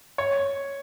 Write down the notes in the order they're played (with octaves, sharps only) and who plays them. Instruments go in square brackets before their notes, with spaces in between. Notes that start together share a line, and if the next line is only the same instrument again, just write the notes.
[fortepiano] C#5